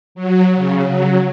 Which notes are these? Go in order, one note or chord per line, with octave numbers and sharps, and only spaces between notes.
F#3
C#3
F#3